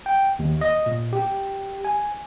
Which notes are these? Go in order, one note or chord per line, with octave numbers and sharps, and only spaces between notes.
G5
D#2
D#5
A#2
G4
G#5